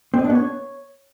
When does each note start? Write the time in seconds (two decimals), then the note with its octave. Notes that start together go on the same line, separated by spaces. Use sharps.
0.14 C4
0.19 D#5
0.24 D4
0.30 B3
0.35 C#5